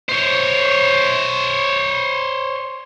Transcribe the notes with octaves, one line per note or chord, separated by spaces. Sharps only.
C5 C#5